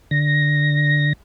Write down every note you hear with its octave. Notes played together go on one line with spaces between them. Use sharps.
D3 A#6